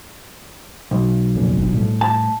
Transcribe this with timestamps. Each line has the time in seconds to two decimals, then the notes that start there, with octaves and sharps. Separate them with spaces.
0.91 B1
1.35 F2 A#2 C#3
1.57 G1
1.72 A2 G3 A3
2.01 A5